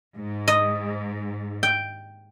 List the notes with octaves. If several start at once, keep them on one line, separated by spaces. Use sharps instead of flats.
G#2
D#5
G5